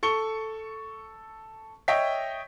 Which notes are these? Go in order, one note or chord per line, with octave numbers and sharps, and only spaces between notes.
A4 C#6 C#7 G7
C#5 D#5 E5 G5 B6